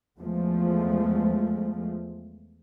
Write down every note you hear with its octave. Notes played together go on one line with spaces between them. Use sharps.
E2 F3 G#3 A3